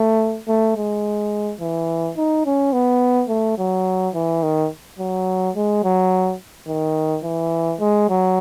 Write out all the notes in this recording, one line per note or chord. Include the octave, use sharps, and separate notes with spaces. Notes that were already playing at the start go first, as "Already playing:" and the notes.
Already playing: A3
A3
G#3
E3
D#4
C#4
B3
A3
F#3
E3
D#3
F#3
G#3
F#3
D#3
E3
G#3
F#3